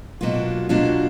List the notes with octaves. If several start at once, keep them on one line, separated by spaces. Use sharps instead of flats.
B2 F#3 A#3 D4 F4
B2 F#3 A#3 D4 F4